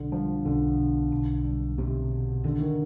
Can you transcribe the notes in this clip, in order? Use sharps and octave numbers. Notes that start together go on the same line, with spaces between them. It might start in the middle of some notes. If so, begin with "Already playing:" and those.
Already playing: B1 D3
F3 G3
B1 D3
B2
B1
G3
B1 C3
B2
D#2 D3
D#3